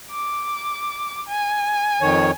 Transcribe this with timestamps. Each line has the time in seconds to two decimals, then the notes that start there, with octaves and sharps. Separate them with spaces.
0.11 D6
1.28 G#5
2.01 F2 D#3 C#5